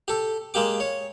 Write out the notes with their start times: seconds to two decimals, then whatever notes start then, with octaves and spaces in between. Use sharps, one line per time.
0.08 G4 A4
0.54 G#3 A#3 G4 D6
0.80 C#5